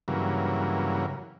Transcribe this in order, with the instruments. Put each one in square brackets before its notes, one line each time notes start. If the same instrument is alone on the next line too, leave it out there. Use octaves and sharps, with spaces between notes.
[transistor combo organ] G2 C#3 E3 F#3 A#3